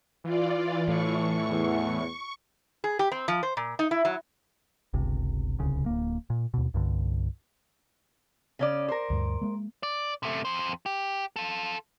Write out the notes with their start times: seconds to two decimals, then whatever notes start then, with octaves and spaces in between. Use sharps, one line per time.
0.24 E3 F4 D5
0.88 A2 C#6
1.48 E2
2.84 G#4
2.99 G4
3.12 C4
3.28 F3
3.43 C5
3.57 A#2
3.79 D#4
3.91 E4
4.05 F#3
4.94 G1 C#2 C3
5.59 D1 C2 C#3
5.86 D1 A#3
6.30 A#2
6.54 D#2 B2
6.74 C2 G2 D3
8.59 C#3 C#4 D5
8.88 A#4 C5
9.10 D2 G2
9.42 G#3 A#3
9.83 D5
10.23 C3 A3
10.45 F2 C5
10.86 G4
11.36 F4 A4